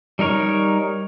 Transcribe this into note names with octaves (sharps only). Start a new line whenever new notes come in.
G3 D#4 A#4 C#5